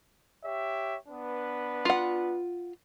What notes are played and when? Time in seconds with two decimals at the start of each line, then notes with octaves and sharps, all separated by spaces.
0.44 G4 C#5 E5
1.08 B3 D4 B4
1.85 F4 F#5